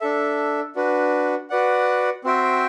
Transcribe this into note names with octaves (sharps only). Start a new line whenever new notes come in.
D4 A4 E5
D4 F#4 B4
F#4 B4 D5 F#5
C4 F#4 C5 E5 G5